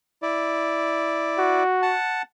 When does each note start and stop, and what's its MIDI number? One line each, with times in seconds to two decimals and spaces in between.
0.22 1.63 64
0.22 1.63 74
1.38 1.95 66
1.82 2.22 78
1.82 2.22 81